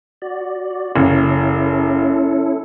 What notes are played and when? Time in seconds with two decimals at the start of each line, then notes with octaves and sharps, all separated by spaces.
0.22 F#4 D5
0.96 F#1 C#4 E4 A4